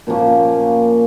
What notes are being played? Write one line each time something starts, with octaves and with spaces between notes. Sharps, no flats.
A#2 F3 A#3 C#4